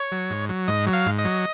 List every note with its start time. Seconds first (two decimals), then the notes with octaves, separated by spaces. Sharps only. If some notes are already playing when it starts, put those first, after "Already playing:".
Already playing: C#5
0.12 F#3
0.30 G#2
0.49 F#3
0.68 G#2 D#5
0.87 F#3
0.93 F5
1.06 G#2
1.19 D#5
1.25 F#3